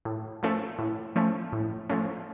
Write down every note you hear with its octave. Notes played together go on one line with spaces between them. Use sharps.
A2
F3 A3 C#4
A2
F3 A3 C#4
A2
F3 A3 C#4